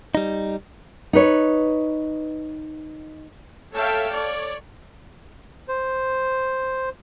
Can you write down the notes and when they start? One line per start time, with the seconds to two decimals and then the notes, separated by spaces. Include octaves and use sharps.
0.15 G3 D#4
1.13 D#4 B4 C#5
3.74 A4 C#5 E5 F5 G5 A5
4.11 C#5 D5
5.68 C5